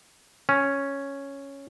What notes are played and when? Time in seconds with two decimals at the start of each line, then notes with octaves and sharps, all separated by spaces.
0.49 C#4